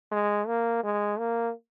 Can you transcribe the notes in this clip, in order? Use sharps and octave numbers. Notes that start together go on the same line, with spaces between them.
G#3
A#3
G#3
A#3